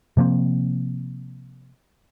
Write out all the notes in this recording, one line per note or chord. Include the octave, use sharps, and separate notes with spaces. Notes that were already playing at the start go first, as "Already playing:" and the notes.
C3 F3 A#3 C4